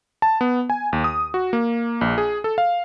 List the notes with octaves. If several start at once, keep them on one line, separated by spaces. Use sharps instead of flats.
A5
B3
G#5
D#2
D#6
F#4
A#3
A#1
G#4
A4
F5